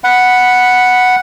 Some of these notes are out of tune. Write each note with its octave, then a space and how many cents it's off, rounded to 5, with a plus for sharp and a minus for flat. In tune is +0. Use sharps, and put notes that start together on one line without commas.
F#5 +0 B5 +0